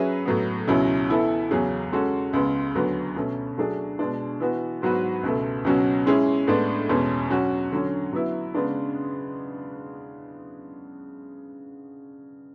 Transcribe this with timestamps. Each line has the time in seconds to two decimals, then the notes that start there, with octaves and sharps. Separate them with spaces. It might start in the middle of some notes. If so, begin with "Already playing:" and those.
Already playing: F#3 C#4 G#4 B4 E5
0.25 A2 F#3 B3
0.67 C#2 B2 F#3 C#4 E4
1.09 E3 B3 E4 A4
1.51 E2 C#3 F#3 C#4 G#4
1.92 G#3 C#4 F#4 A4
2.33 C#2 C#3 G#3 B3
2.75 D2 D3 F#3 B3
3.16 B2 A3 C#4
3.58 F#3 A3 D4 G#4
3.99 B2 G#3 D4
4.40 E3 B3 F#4
4.82 G#2 F#3 B3 F#4 B4
5.23 C#2 B2 A3
5.64 C#2 B2 F#3 C#4 F#4
6.06 G#3 C#4 E4 G#4
6.48 A2 G#3 B3 D4
6.89 E2 B2 G#3 C#4
7.30 F#3 C#4 F#4
7.72 D3 F#3 C#4
8.13 F#3 B3 E4
8.54 C#3 G#3 B3 D4